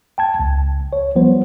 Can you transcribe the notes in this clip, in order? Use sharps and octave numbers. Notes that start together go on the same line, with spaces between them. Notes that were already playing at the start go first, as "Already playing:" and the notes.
G5 A5 G#6
C#2
C#5
F3 G3 B3 C5